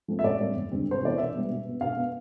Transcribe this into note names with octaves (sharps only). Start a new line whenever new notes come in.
F3 A3 C4
E5
A2 D5
G3 C4
E2
D3 G3 C4
C3 C5
E3 B3 D5
B2 E5
G3 B3
B2
B3
B2 F5
B3